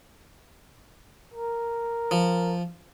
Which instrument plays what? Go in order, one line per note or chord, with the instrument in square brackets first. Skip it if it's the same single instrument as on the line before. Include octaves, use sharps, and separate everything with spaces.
[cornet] A#4
[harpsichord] F3